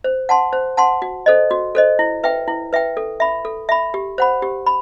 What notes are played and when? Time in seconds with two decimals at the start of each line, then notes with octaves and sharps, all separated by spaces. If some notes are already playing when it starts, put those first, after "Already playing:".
0.04 C5
0.29 F#5 A5 C6
0.53 C5
0.77 F#5 A5 C6
1.02 F#4
1.26 A4 C5 D#5
1.51 F#4
1.75 A4 C5 D#5
1.99 E4
2.24 B4 E5 G5
2.48 E4
2.73 B4 E5 G5
2.97 A4
3.20 E5 B5
3.45 A4
3.69 E5 B5
3.94 G4
4.18 C5 F#5 B5
4.42 G4
4.66 B5